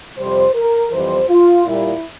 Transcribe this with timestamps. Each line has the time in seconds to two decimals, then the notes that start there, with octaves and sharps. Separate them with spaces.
0.17 F2 C3 G3 C5
0.54 A#4
0.91 F2 E3 G3 C5
1.29 F4
1.65 A#2 G3 E4